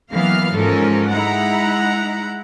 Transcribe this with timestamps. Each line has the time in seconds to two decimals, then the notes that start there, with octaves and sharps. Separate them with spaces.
0.11 E3 F#3 A#3 B3 F5 F6
0.55 G#2 F3 C#4 A4 A#4
1.09 G#3 D#4 E4 F#5 A#5